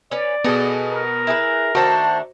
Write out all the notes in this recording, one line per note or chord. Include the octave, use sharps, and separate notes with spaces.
C#4 B4 D5
B2 B3 G#4 A4 D#5
A#4
E4 G#4 B4
D#3 A3 D4 F#4 C5 A5